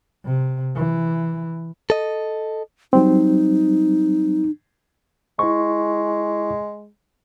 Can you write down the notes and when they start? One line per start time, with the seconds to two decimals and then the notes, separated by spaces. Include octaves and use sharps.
0.25 C3
0.76 E3
1.90 A4 D#5
2.93 F#3 G3 C4 D#4
5.39 G#3 E4 C#6